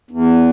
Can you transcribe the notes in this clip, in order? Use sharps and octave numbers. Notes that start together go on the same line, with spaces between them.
E2